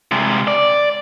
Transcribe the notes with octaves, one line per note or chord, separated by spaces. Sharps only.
C3 G#3
D5